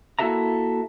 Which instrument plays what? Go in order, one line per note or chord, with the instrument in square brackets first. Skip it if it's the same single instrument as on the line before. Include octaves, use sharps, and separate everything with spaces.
[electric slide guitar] A#3 E4 F#4 A4 E5 A#5